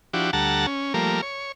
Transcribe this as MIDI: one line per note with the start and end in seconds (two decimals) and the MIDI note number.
0.13 0.31 53
0.13 0.31 62
0.13 0.31 64
0.13 0.31 66
0.13 0.31 67
0.33 0.66 38
0.33 0.66 55
0.33 0.66 69
0.33 0.66 78
0.33 0.66 81
0.33 0.66 82
0.67 0.93 61
0.94 1.21 53
0.94 1.21 55
0.94 1.21 57
0.94 1.21 58
0.94 1.21 70
1.22 1.52 73